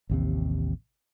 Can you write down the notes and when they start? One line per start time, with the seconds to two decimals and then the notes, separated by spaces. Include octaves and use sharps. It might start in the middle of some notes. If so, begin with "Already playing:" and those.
0.10 A1 D#2 C3